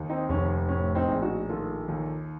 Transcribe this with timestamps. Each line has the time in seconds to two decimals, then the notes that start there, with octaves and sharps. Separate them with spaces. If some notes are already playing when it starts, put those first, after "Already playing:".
Already playing: D#2
0.09 C4 D#4
0.29 F1 C#4
0.69 A2 C#4
0.95 C4 D#4
1.08 A#1
1.22 D#4 F#4
1.49 D#3 F4 A4
1.88 D#2